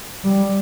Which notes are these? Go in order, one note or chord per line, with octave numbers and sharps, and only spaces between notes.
G3